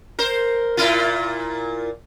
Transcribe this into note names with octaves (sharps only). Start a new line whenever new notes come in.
A#4 C5
A#2 E4 F4